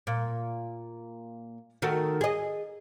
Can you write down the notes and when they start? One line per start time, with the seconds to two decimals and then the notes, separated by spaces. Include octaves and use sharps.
0.07 A#2
1.82 D#3 A3 F#4
2.21 G#4 D#5